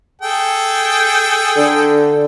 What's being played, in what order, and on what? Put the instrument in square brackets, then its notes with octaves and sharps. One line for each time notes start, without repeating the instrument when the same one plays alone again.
[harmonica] G#4 A4 G5
[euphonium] D3